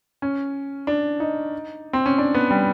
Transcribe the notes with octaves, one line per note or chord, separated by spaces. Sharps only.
C#4
D4
D#4
C4
C#4
D4
B3
G3